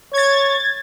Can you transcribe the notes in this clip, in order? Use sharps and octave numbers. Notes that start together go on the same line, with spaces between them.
C#5 G#6 A6